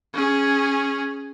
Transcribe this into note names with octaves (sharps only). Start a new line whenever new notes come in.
C#4 G#4